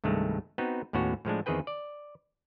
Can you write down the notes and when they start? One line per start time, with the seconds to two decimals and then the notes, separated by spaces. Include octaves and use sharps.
0.04 C2 G2 D#3 G#3 A3
0.58 B3 C4 D#4 F#4 B4
0.93 D#2 A2 B3 C#4 F#4
1.25 A2 F3 G#3 D4
1.46 E2 D#3 C4 G#4 B4 G5
1.67 D5